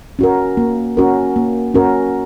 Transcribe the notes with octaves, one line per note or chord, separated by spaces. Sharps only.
C#4 F#4 A#4
A#3
C#4 F#4 A#4
A#3
C#4 F#4 A#4